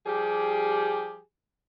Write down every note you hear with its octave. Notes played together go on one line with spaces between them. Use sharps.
F3 G3 G4 G#4